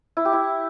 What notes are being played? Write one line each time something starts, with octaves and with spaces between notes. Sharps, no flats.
E4
G4
E4